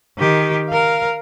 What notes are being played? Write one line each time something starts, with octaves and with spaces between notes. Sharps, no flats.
D#3 G4
A#4 F5